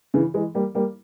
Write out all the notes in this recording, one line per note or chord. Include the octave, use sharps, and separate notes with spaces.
C#3 E3
E3 G#3
G3 A#3
G3 A#3